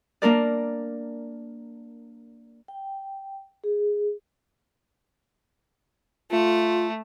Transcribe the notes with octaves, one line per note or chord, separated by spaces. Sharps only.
A#3 D4 A#4 D5
G5
G#4
A3 F4